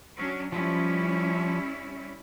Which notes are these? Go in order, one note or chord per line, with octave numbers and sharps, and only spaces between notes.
F#3 C#4 D4
F3 G3 C#4 E4